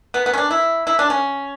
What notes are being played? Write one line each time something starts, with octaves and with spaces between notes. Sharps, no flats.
B3
B3
C#4
D4
E4
E4
D4
C#4